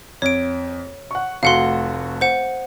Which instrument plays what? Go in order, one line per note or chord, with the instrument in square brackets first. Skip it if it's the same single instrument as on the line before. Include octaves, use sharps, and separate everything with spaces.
[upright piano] F2 [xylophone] C#5 D7
[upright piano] F#5 C#6
[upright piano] F1 A3 F#4 [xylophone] F5 F#5 C6
[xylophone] C5 F#5